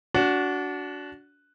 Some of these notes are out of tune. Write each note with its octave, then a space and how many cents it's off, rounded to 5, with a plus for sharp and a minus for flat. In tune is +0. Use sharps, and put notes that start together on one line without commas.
D4 -25 F#4 +0